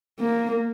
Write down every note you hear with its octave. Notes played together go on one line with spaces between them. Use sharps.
A#3